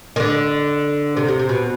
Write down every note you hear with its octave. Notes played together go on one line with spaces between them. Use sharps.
D#3
D3
C3
C3
C3
B2